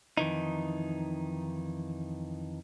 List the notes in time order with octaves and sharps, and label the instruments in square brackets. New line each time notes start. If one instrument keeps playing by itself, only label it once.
[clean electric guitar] F2 D#3 E3 D#4